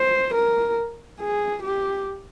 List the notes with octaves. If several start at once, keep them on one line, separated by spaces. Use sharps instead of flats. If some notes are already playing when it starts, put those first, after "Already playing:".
Already playing: C5
A#4
G#4
G4